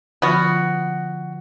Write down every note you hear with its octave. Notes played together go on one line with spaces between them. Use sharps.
D3 F3 B3 F4 F#4